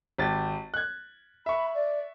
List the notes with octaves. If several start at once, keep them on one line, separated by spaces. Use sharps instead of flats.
G#1 G4 A6
F#6 G#6
E5 B5 C#6
D5